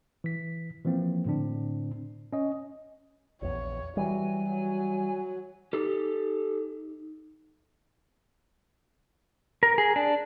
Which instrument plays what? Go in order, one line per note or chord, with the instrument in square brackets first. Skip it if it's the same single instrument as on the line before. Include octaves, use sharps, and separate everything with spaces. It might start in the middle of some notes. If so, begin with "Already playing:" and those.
[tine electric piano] E3 B6
E3 F3 A#3 C4
A2 D3 C4 D4
C#4 D#5
[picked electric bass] A#1 E2 [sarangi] C#5
[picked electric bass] E3 G3 [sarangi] F#3 [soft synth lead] G#5
[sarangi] F#3
[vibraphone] D#4 [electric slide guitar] G4 A4
[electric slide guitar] A#4
G#4
D4